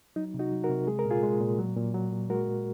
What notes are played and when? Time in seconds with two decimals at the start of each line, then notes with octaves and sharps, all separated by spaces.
0.16 F#3 D#4
0.34 C3
0.39 D#4 F#4
0.52 F#3
0.63 F#4 A#4
0.69 C3
0.87 G#3 G#4
0.99 A#4
1.05 A#2
1.10 F4 G#4
1.23 G#3
1.41 A#2
1.59 F#3
1.76 A#2
1.94 F#3
2.12 A#2
2.30 G#3 F#4 A#4
2.48 A#2